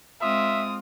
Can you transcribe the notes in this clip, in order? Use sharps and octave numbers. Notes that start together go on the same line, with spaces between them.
G#3 C4 F4 E5 D#6